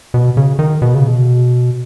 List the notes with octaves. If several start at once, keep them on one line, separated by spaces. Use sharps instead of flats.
B2
C#3
D#3
B2
C#3
B2